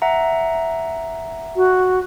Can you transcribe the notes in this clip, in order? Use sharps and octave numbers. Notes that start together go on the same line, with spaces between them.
E5 F#5 A#5
F#4